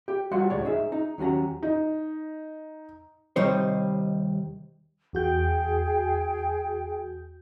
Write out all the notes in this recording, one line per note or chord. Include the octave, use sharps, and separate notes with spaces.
G4
G3 F4 F#4 F#5 C6
D2 A2 G#3 C#5 D5
D#4 G#4 E5
D#4
D#2 F#3 C#4 F#4 A#5
D#4
D#2 C3 G3 D#4 C5 C#5
E2 F#4 G#4 G5 G6